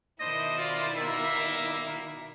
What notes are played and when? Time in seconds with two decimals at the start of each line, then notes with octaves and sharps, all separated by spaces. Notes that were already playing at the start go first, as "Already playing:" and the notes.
0.20 B2 D#3 D4 E4 C5 D#5
0.58 F4 C5 D5
0.97 G3 A#3 E5